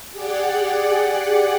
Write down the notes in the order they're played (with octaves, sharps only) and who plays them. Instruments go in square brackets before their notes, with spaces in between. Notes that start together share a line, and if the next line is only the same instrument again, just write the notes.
[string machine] G4 G#4 D5 F#5